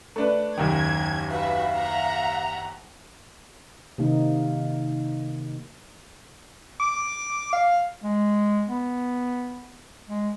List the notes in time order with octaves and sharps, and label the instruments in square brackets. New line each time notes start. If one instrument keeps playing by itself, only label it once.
[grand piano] A3 D4 B4
[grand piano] F#1 D#2 D#3 [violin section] G#6
[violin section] F#4 B4 E5 [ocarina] F5
[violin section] E5 F#5 A#5
[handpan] C3 D#3 A#3 D#4
[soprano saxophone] D6
F5
[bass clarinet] G#3
B3
G#3